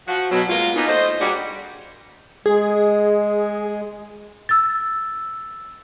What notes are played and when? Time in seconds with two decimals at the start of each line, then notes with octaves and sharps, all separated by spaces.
0.07 F3 F#4
0.32 B2 F#3
0.49 G#3 A#3 B3 F4
0.76 A#3 B3 C#4 D#4
0.87 A3 C5 D#5
1.20 A#2 G3 D4 F#4 G#4 D5
2.46 G#3 G#4
4.49 E6 A6